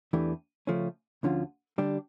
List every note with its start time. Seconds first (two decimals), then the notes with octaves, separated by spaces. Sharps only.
0.13 E2 E3 A3 D4 G4
0.67 C#3 F3 A3 C#4
1.23 D2 D3 F3 C#4 F4
1.78 D3 G3 D4 G4